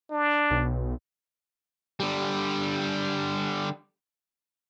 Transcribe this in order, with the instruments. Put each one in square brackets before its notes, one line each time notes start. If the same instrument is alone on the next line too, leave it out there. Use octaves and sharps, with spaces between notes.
[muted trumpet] D4
[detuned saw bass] B1
[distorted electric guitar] D3 G3